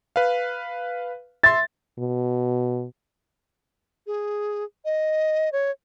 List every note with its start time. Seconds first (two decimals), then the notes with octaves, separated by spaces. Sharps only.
0.16 B4 F5
1.43 E5 C6 A6
1.99 B2
4.07 G#4
4.85 D#5
5.52 C#5